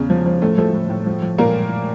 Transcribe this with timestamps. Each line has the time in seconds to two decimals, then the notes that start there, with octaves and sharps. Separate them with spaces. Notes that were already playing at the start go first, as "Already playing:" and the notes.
Already playing: E2 C#3
0.10 F3
0.26 F3
0.42 A2 A3 A4
0.58 F3 A3 A4
0.74 A2
0.90 A2
1.06 F3
1.22 F3
1.38 A#2 A#3 A#4